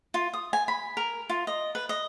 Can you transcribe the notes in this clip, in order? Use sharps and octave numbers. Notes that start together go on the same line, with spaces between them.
F4
D#6
G#5
B5
A#4
F4
D#5
B4
D#5